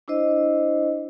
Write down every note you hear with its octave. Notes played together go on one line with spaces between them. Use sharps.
D4 E4 C5 D#5